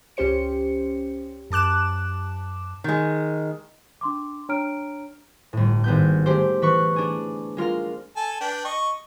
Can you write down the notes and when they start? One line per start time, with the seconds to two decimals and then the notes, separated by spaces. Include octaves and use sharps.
0.17 C#2 C#4 G4 C5 C#7
1.51 F#2 A5 D6 F#6 E7
2.84 D#3 G#3
4.01 D4 C6 D6
4.49 D4 C#5 A#5 F6 D7
5.53 G1 A2
5.84 G#1 B3 G6
6.26 G#3 A3 G4 C5
6.62 E3 B4 B5 C#6
6.96 D4 G#4
7.57 G#3 F4 A#4 F5
8.16 A4 G#5 A5
8.41 D4 B4 G5
8.65 D#5 C#6